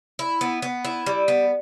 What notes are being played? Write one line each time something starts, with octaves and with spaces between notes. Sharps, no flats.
E4
B3
B3
E4
G3
B3